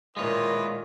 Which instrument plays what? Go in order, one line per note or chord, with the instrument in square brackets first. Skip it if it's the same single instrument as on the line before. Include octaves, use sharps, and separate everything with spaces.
[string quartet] A#2 D#3 [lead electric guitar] G#3 C#5 [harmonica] E4 F4 B4 [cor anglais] D#5